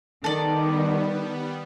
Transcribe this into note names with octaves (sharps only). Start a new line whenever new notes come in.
D#3 G3 B3 A4 D5